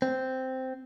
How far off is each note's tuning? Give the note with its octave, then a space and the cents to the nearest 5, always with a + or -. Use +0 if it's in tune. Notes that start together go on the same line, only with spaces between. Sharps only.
C4 -5